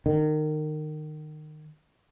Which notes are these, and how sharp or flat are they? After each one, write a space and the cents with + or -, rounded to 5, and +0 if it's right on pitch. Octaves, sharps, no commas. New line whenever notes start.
D#3 -25